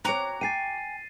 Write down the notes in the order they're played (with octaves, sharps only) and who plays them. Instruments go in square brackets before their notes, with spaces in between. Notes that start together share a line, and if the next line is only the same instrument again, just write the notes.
[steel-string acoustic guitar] C4 C#5 [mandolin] F#4 A#5 D6
[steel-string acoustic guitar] G5 G#5 [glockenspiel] A6 C7 D#7